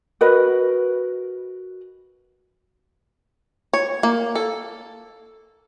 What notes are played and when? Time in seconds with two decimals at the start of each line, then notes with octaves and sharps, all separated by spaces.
0.21 F#4 A#4 B4 D#5
3.74 C#5
4.03 A#3
4.35 A4